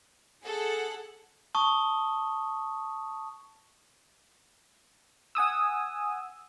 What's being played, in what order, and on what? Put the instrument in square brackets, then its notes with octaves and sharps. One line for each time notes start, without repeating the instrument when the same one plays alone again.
[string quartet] G#4 F#5 [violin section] A4
[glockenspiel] A5 C#6 D#6
[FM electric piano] F#5 G#5 D#6 E6